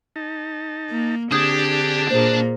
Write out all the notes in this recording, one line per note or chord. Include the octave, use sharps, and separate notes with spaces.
D#4 A5
A#3
D3 C4 D4 G4 G#4 D#6 G6 G#6
A#2 A#3 G#4 C5